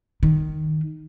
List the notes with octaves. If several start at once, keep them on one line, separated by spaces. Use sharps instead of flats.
D#3